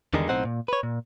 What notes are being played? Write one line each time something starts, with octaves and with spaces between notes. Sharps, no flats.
E2 D3 D#3 G3 G#3 D#4
B1 A2 C4 D#4 C5 F#5
A#2
B4 C#5
A#2